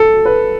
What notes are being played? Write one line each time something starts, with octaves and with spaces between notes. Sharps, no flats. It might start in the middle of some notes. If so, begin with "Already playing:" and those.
Already playing: A4
B4